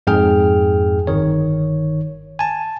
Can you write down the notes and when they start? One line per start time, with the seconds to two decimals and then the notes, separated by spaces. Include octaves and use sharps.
0.07 F2 G#2 G#4 G5 F6
1.07 G1 D#3 C#5
2.39 G#5 A5